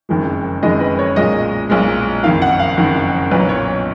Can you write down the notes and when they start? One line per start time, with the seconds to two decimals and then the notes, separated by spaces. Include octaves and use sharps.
0.09 F#1 F2 D#3 G#3
0.63 F#1 F2 D#3 G#3 D#5
0.80 B4
0.99 C#5
1.16 B1 A#2 G#3 D#5
1.70 B1 A#2 G#3
2.24 F#1 F2 D#3 F5
2.42 F#5
2.59 F5
2.77 F#1 F2 D#3
3.31 B1 A#2 F#3 B4
3.49 C#5